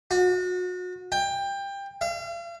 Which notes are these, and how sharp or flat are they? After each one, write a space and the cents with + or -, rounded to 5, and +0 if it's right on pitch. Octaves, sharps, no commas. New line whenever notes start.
F#4 -35
G5 +20
F5 -40